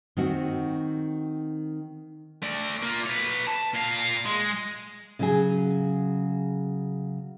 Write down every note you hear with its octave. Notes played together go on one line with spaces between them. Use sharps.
D#3 C4 F#4
A3 D5
A#3 F4
B4 C#5
A5
A#2 F5
G#3
C#3 F#3 G#4